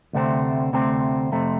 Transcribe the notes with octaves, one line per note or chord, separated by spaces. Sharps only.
D2 C3 A3 C4
D2 C3 A3 C4
F2 C3 A3 C4